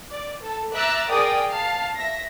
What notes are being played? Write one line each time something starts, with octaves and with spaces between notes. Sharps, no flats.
D5
A4
E5 A#5 D6 E6 F#6 A6
G#4 A#4 D5 G5 D#6
F5 A5
E5 A#6